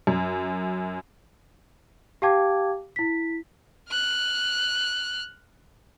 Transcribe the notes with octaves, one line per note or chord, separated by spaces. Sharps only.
F#2
G4 F5 G5 A5 D6 G#6
E4 B6
F6 F#6